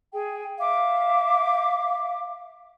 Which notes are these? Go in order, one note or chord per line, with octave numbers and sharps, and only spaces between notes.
G#4 G5
E5 F5 D6